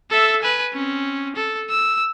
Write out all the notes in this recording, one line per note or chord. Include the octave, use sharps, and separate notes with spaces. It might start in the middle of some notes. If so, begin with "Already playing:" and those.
A4 E5
B4 G#5
C4 C#4
A4
E6